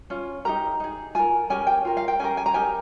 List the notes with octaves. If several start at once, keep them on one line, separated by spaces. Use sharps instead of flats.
C#4 F4
D#4 G4 A#4 A#5
D#4 G#4
F4 A#4 G#5
C#4 G4 A#4 G#5
G5
F4 A#4
F5
G5
C#4 G4 A#4 G#5
G#5
A#5
D#4 G4 A#4 G#5